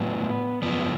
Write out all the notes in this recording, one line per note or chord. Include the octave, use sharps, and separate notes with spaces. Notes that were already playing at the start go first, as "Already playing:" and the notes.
Already playing: A2 F#3 B3
F#2 C#3 F3 B3